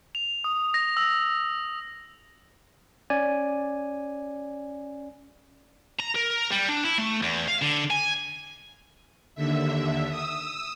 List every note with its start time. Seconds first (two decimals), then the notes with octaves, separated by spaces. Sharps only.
0.15 F7
0.44 D#6
0.74 A#6
0.97 E6
3.10 C#4 D5 G#5
5.99 A#5
6.15 A#4
6.51 G3
6.68 D4
6.84 E4
6.98 A3
7.22 E2
7.48 F5
7.62 D3
7.91 G#5
9.35 D#2 D3 E5
10.09 D#6 E6